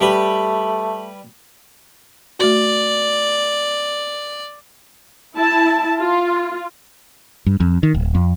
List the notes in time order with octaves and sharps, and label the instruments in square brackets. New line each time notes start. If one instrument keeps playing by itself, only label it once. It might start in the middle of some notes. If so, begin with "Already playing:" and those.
[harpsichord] G3 B4 [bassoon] A3
[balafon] A3 F#4 [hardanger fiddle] D5
[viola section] E4 A5
F4
[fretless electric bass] G2
F2
D#3
D1
F2